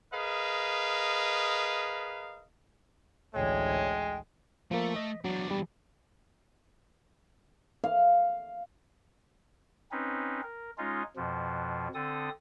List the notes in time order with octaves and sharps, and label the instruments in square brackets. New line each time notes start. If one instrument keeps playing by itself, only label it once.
[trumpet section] G#4 A#4 B4 D#5 F5
[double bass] A1 D2 [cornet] G#3 [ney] C#5 [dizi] G5
[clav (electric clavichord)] F3 A#3 [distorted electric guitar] A3 E5
[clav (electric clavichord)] D#5
[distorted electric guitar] E2 D4 [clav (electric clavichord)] F#3
[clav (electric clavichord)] G3
[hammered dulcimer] F5
[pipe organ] C4 C#4 D#4 B4
A#4
G#3 C#4 D#4 F4
F2 B2 F3
D3 C4 A4 D#6